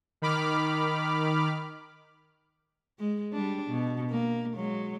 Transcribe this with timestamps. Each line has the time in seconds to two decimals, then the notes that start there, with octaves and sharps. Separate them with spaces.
0.22 D#3 B5 D6 F6
2.99 G#3
3.33 G3 D4
3.70 B2
4.10 A#3
4.55 F#3 G#3